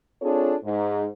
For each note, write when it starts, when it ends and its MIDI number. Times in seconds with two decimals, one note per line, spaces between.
0.21 0.55 60
0.21 0.55 62
0.21 0.55 65
0.21 0.55 68
0.21 0.55 69
0.21 0.55 73
0.63 1.05 44